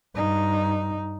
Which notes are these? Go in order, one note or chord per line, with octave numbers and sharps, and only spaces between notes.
G2 D#4